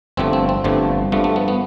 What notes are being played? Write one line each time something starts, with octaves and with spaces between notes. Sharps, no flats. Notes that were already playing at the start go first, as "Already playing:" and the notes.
G1 G2 F3 A3 C4
C4
C4
G1 G2 F3 A3
G2 F3 A3 B3
A3
B3
B3